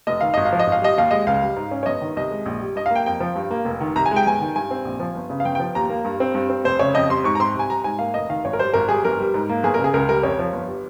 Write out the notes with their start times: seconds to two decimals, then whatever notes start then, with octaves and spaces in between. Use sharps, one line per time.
0.07 F1 D#5
0.21 D#3 F5
0.34 G#1 D#5
0.45 F5
0.53 F3
0.59 D#5
0.67 G#1
0.72 F5
0.82 G3 D#5
0.97 D#2 F5
1.11 G#3 D#5
1.27 C#2 F5
1.42 G3
1.56 G#2
1.71 C#4
1.83 C#5
1.86 G1 D#5
2.02 D#3
2.17 C2 D#5
2.31 G#3
2.46 A#1
2.61 G3
2.76 G2 D#5
2.86 F5
2.90 A#3 G5
3.06 F2 G5
3.20 F3
3.35 G2
3.51 A#3
3.65 F1
3.81 D#3
3.96 C2 A#5
4.06 G#5
4.11 G#3
4.16 G5
4.26 G1 G#5
4.41 D#3
4.56 G2 G#5
4.71 C4
4.85 A#1
5.00 F3
5.15 G1
5.30 C#3
5.40 F5
5.45 G1 G5
5.55 G5
5.60 F3
5.75 D#2 A#5
5.90 A#3
6.05 G2
6.20 C4
6.34 G2
6.50 C4
6.64 F1 C5
6.79 C#3 C#5
6.94 F2 D#5
7.09 G3 C6
7.24 G#2 C#6
7.35 A#5
7.40 C4 C6
7.55 C2 G#5
7.70 G3 A#5
7.84 G#2 G#5
7.99 A#3 F5
8.14 F1 D#5
8.29 D#3 F5
8.45 G#1 C#5
8.53 A#4
8.59 G3 C5
8.74 G#1 A#4
8.89 G3 G#4
9.04 G1 A#4
9.19 G3
9.34 G#2
9.49 A#3
9.63 G1 G#4
9.74 A#4
9.79 C#3
9.84 G#4
9.94 C#2 A#4
10.09 G3 A#4
10.23 F2 C#5
10.39 F3
10.53 G1
10.68 G3